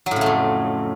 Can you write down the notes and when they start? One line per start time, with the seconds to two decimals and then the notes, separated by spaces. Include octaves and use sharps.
0.06 F#3
0.11 A2
0.16 C#3
0.21 A3
0.26 F2